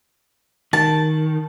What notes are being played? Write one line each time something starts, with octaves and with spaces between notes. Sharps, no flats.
D#3 A5